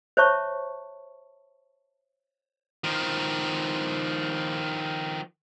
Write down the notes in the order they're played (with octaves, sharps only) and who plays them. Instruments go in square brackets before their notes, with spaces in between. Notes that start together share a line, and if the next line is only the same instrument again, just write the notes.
[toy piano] C5 C#5 E5 A5 C#6
[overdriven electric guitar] D#3 F3